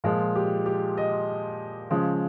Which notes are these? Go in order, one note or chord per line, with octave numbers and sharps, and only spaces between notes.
A#2 F3 G#3 F4
G4
G4
D#5
C#3 F3 G#3